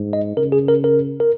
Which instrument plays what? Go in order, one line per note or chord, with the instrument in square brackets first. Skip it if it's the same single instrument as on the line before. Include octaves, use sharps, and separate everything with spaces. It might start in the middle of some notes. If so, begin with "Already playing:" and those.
Already playing: [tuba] G#2
[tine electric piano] D#5
[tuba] C#3 [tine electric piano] A#4
[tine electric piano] G#4
A#4
A#4
A#4